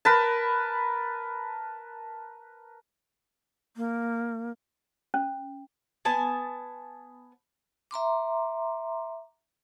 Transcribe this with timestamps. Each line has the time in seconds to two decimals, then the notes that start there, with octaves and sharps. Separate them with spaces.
0.05 A#4 B4 A5
3.77 A#3
5.14 C#4
6.05 B3 G#5 A5
7.91 E5 A#5 C6 D6